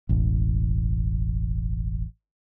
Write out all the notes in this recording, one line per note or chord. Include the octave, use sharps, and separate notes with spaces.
E1 A1